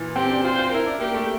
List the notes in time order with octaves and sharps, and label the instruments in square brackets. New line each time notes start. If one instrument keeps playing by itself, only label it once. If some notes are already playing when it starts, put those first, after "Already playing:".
Already playing: [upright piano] A#2 E3
[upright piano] C4 [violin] G4
[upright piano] D4
[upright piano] F4 [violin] C5
[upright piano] F4
[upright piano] E4 [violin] A#4
[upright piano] D4
[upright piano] A#3 [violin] G4
[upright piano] A3